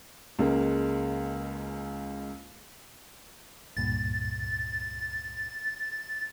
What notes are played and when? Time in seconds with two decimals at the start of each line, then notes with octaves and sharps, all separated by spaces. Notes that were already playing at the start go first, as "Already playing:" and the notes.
0.39 C#2 C#3 G#3 A#3
3.77 C#2 G2 A#2 A6